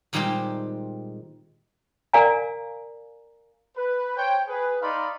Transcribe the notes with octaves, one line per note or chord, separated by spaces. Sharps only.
A#2 D#3 G3 G#3 C4 G4
A#4 D5 F5 G#5 A#5
B4
C5 C#5 G5
G#4 B4
D#4 D5 F5 B5 C6